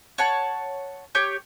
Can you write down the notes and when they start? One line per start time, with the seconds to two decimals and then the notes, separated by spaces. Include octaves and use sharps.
0.18 C#5 F#5 A5
1.15 G4 C#5 G6